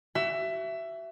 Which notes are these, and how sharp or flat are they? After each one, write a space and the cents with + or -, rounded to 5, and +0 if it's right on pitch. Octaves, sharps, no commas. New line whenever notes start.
F#4 +35 E5 +15